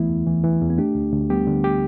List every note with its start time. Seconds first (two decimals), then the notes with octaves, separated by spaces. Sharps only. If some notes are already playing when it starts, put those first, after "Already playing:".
Already playing: D2 E3 A3 B3 E4
0.09 E2
0.27 E3
0.44 E3
0.61 E2
0.70 B3
0.78 A3 D4 G4
0.96 D2
1.13 D2
1.30 G3 B3 G4
1.47 D3
1.64 G4